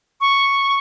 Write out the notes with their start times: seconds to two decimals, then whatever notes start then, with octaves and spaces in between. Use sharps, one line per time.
0.21 C#6